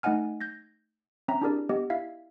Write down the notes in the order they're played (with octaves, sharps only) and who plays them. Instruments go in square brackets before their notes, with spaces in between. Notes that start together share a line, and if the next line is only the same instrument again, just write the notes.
[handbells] A3 D#4 D#5 F#5 G#5 F6
G6 G#6 A#6
C4 C#4 E5 A#5
D4 E4 G4 G#4 A#4 D5
B3 G4 D#5
E4 E5 F5 G#6